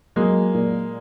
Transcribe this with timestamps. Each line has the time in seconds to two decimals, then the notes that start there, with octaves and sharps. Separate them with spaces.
0.16 F#3 G#3 A#3
0.54 A#2